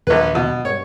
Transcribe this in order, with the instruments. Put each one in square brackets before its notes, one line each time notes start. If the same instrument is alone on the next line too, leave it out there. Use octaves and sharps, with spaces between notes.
[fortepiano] A#1 B4 [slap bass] D#2 F#3
[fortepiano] B2
[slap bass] G2 [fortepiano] C#5